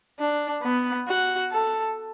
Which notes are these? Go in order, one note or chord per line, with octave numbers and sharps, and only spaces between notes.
D4
B3
F#4
A4